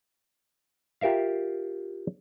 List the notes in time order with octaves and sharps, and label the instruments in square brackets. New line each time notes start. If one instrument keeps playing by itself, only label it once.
[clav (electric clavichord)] F4 G4 A#4 E5 F5